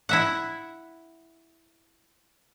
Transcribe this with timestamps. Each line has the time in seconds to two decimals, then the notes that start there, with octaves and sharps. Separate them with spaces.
0.09 E4 E5 F#5